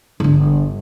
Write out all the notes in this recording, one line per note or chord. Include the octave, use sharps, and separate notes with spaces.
G1 D3